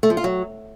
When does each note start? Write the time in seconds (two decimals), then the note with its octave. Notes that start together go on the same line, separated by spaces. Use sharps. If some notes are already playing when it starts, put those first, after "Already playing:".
0.03 A3
0.10 F3
0.17 F4
0.24 F#3